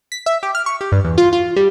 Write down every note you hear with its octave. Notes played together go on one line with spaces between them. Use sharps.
B6
E5
G4
F6
C#6
G4
G2
E2
F4
F4
G3